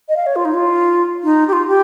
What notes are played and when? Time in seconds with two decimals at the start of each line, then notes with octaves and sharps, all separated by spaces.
0.09 D#5
0.16 F5
0.26 C#5
0.36 F4
0.45 D#4
0.54 F4
1.24 D#4
1.48 G4
1.53 F4
1.68 G4